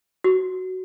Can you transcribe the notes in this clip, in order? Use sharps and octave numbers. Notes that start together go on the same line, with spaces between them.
F#4